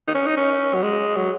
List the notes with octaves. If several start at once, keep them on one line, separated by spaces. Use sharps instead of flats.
D#4
C#4
D#4
C#4
F#3
G#3
F#3